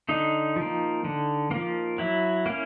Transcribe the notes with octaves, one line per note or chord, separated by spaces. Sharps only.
D3 D#4
F3
A#3
D3
F3 A#3
F#3 E4
A#3 C#4